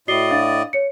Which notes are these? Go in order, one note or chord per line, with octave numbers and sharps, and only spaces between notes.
A2 F#4 D5 D#5 C7 G7
D4 F5 A6
C#5 C#7